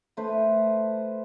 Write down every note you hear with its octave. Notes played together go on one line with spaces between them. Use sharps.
A3 B4 C5